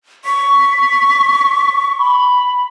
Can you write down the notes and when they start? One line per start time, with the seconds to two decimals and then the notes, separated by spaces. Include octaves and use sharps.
0.25 C#6 B6
1.98 B5